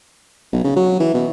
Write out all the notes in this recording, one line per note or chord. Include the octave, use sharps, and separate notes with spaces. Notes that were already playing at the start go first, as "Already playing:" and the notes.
B1
C#3
F#3
E3
B2